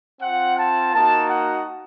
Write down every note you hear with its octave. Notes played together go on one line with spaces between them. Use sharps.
C4 F4 F#5
A5
A#3 D#4 F#4 A5
F#5